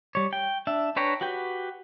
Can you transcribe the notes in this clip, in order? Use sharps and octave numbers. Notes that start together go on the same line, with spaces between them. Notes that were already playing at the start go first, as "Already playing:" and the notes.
G3 C#5
G5
D4 E5
D4 B4 C#5 G5 A#5
F#4 G4 B4 G5